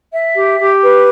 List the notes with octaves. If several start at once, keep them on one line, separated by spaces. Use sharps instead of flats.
E5
G4
G4
B4